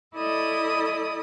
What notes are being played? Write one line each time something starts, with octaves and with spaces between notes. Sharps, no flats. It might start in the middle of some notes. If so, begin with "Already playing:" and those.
E4 A4 D5 D#5 B5 D#6